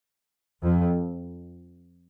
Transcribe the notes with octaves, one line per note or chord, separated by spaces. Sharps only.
F2